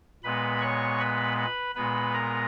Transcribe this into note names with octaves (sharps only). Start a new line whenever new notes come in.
A#2 G#3 B3 B4 B5
C#5 C#6
B4 B5
B4 B5
A#2 G#3 B3 B4 B5
A#4 A#5